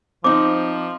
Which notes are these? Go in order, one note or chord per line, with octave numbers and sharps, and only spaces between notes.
F3 C4 D#4 D6